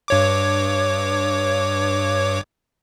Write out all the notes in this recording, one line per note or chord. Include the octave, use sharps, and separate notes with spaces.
G2 C#5 D6